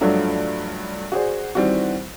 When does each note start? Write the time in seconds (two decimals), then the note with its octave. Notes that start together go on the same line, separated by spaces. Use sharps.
0.01 G2 F3 F#3 A3 D4
1.12 F#4 G#4 C5 D5
1.55 D#3 E3 G3 C4 F#4